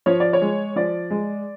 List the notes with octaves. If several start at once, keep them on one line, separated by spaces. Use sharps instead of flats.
F3 C#5
D5
C#5
G#3
F3 D5
G#3